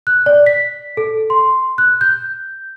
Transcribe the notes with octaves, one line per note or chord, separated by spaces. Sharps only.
F#6
D5
B6
A4
C6
F#6
G6